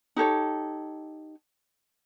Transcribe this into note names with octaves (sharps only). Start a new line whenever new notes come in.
D#4 G4 A4 C#5